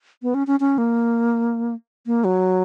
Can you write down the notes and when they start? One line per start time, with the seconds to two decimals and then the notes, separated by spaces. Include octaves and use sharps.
0.22 B3
0.34 C#4
0.47 C#4
0.60 C#4
0.78 A#3
2.06 A#3
2.24 F#3